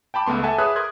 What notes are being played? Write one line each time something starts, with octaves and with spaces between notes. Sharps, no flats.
G5 A5 B5 D6
C#2 A3 B3 C6
A4 E5 F#5 G#5 A5
G#4 B4 C#5 E5 D#6 F#6
A#4 C6 D#6 F#6 G#6